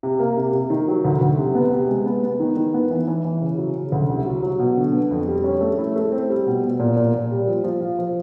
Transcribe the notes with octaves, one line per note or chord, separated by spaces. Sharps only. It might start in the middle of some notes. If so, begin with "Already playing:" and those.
C3
A#3
C3
C3
D#3
F#3
D2
D2
C3
B3
C3
G#3
B3
B3
D#3
D#3
B3
E3
E3
E3
C#3
F#3
C#3
D2
C2
F#3
F#3
B2
D3
B3
F2
G3
C#4
A3
E4
A3
C4
G3
B2
B2
A#2
A#2
A#2
G3
F3
F3
F4
F3